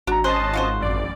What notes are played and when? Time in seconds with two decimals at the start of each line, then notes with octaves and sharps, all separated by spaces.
0.07 G#1 D4 F#4 A#5
0.24 C#4 C5 D#5 A5 F#6 C7
0.54 F4 F#4 C5
0.79 A1 F#2 D5